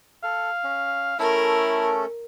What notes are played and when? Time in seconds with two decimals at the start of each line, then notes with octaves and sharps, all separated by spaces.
0.24 A4 F5
0.64 C#4
1.19 A3 C#4 E4 A4 A#4